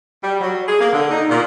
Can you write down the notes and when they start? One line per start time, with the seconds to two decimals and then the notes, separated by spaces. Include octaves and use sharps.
0.23 G3
0.41 F#3
0.68 G#4
0.80 A#3
0.93 D3
1.11 D#4
1.30 A#2